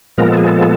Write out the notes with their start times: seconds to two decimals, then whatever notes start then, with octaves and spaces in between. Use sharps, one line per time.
0.18 A#2 F3 G#3 B3 A#4
0.28 A4
0.37 G#4
0.47 A4